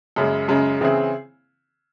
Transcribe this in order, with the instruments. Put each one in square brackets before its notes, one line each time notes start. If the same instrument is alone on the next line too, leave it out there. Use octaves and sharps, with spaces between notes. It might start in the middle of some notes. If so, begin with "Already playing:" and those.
[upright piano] F#2 C#3 G#3
F#2 C#3 G#3
C#3 E3 C4 E4 G#4